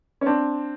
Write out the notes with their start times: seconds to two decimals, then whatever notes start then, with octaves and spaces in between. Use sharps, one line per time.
0.21 C#4
0.26 C4 D4